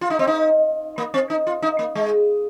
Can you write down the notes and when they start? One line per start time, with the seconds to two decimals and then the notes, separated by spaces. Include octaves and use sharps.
0.01 F4
0.10 D#4
0.19 C4
0.27 D#4
0.98 A#3
1.14 C4
1.30 D#4
1.47 F4
1.62 D#4
1.79 A#3
1.95 G#3